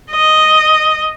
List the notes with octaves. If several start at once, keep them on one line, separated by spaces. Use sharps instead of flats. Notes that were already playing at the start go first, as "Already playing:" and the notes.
D#5